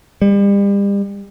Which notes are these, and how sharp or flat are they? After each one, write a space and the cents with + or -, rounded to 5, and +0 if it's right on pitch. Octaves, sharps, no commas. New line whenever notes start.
G3 +35